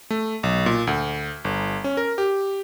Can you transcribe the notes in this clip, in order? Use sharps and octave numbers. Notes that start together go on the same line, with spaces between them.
A3
B1
A#2
D2
G1
C#4
A#4
G4